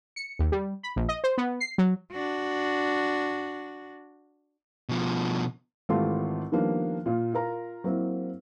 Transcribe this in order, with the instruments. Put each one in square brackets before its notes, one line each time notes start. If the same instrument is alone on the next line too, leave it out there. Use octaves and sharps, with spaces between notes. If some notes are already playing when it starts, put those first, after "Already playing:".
[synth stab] C#7
D#2
G3
B5
A#1
D#5
C5
B3
C7
F#3
[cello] D4 F#4
[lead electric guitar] B2 F3
[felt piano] G#1 E3 A3 F4 G4 C6
D#3 F3 G3 A#3 B3 D4
A#2 F4
F4 A#4 A#5
F#3 A#3 C4 E4